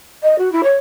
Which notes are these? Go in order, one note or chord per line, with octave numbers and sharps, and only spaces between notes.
D#5
F#4
E4
C#5